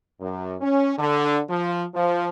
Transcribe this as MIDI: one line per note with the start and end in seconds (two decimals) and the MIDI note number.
0.20 0.55 42
0.61 0.92 61
0.98 1.39 50
1.49 1.83 53
1.94 2.29 53